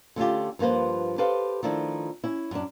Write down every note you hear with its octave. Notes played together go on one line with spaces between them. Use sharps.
D3 A3 C#4 F4 G4
G2 F3 A#3 B4 C5
G4 A4 B4 C5 F5
D#3 F3 A3 D4 E4
C#4 E4
F#2 D4